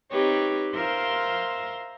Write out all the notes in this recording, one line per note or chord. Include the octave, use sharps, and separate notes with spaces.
C4 D#4 G4 B4 C#5
F4 A#4 C5 E5 C6